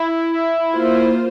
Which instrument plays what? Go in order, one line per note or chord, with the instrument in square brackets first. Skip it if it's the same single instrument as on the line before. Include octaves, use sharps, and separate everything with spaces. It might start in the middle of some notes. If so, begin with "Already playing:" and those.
Already playing: [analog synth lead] E4
[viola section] A#3 F4 C5